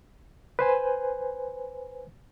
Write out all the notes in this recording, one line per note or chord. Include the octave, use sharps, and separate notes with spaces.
B4 C5 G#5